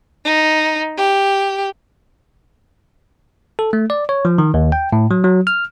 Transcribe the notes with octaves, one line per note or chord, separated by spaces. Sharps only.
D#4
G4
A4
A3
D5
C#5
F3
D#3
D#2
G5
A2
F#3
F#3
F6